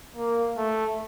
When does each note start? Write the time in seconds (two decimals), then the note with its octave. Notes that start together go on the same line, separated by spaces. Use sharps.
0.16 A#3
0.57 A3